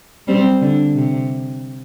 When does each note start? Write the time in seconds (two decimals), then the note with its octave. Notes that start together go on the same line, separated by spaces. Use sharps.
0.27 G3 C4
0.61 D3
0.95 C3